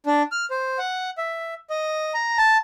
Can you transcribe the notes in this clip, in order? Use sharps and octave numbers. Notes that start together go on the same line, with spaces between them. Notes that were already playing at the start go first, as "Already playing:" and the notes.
D4
F6
C5
F#5
E5
D#5
A#5
A5